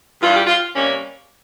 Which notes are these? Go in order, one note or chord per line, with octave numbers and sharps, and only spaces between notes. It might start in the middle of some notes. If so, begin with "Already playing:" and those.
G2 E3 G3 F4
G4
F4
C3 G3 A#3 C#4